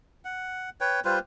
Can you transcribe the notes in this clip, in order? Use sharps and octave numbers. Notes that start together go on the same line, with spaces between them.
F#5
B4 C#5 G5
G3 F4 B4 C5